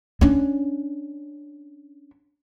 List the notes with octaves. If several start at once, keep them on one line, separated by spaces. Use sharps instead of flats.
C#4 D4